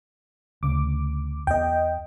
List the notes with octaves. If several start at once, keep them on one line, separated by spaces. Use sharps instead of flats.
D2 C#3 D6
E2 B3 D#5 G5